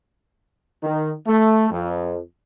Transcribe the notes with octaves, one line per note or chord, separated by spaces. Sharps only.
D#3
A3
F2